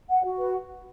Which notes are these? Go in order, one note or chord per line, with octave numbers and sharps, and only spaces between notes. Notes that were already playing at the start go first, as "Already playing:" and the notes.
F#5
F#4
B4